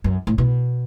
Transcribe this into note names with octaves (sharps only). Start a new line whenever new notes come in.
F#2
A2
B2